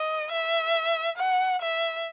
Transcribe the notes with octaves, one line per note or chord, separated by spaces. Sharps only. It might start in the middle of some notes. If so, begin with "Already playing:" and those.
Already playing: D#5
E5
F#5
E5